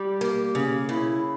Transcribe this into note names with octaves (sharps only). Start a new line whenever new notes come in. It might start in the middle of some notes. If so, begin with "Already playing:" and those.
Already playing: G3 G4
A#3
C#3
C#3 E4